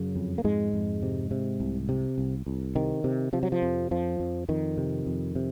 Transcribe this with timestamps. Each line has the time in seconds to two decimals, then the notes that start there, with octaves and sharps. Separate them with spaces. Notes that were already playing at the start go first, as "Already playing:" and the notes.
Already playing: F#2 C#3 F#3
0.16 F2
0.38 A#3
0.44 F2 G#2 G#3
0.73 F2
1.03 C3
1.31 C3
1.60 C2
1.89 C3
2.18 C2
2.46 C2
2.75 C3 D#3
3.04 C3
3.33 C3 F3
3.43 F#3
3.52 F3
3.62 F2
3.91 F2 F3
4.20 F2
4.49 F2 D#3
4.77 C3
5.06 F2
5.35 C3